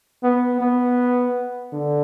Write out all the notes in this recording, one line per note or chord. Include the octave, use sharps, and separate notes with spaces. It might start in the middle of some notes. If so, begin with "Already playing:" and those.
B3
B3
D3